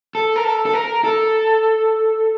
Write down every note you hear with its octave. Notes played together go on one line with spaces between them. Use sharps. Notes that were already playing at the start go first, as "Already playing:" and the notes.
A4
A#4
A4
A4
A#4
A4